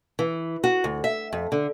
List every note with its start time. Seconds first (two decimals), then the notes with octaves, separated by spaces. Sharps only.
0.19 E3
0.64 F#4
0.84 D2
1.04 E5
1.33 F2
1.52 D3